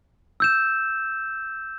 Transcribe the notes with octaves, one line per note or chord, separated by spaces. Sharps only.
E6 G6 E7